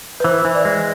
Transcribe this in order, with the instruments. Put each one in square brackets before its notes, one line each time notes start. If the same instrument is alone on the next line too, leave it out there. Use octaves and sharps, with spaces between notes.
[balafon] B4
[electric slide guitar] E3 [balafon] C5
[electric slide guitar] E3
[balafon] D5
[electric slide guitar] G#3